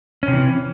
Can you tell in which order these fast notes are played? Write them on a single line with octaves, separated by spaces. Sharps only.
C#4 C3 E3